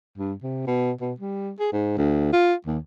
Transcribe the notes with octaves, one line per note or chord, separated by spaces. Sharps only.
G2
C3
B2
B2
G3
G#4
G#2
D2
F4
D#2